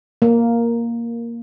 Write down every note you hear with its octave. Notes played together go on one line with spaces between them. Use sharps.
A#3